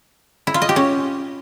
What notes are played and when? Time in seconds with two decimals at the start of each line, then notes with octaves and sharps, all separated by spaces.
0.47 E4
0.54 F4
0.62 D#5
0.69 G4
0.76 C#4